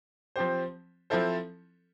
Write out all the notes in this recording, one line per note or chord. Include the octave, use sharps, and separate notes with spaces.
F3 C4 G4 C5
F3 C4 E4 A4 C5